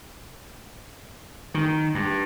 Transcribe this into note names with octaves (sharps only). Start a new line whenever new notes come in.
D#3
G2